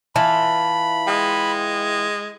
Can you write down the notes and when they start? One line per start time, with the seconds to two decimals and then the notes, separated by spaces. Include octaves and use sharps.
0.16 E3 F4 A5 B5
1.07 G#3 G5 D#6